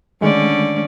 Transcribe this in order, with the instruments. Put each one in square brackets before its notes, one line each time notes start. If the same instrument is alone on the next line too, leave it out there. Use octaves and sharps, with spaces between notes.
[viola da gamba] D3 C#4 D5 [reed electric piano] D#3 G#3 A3